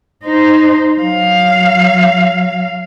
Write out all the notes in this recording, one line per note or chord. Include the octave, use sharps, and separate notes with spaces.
D#4 C5
F#3 F5